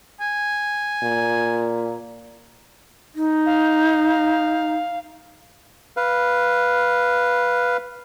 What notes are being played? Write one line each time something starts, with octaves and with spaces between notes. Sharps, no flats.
G#5
A#2
D#4
F5
B4 F5